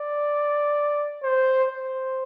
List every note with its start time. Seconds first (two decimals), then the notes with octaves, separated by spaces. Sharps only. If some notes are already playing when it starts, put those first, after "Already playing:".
Already playing: D5
1.23 C5
1.69 C5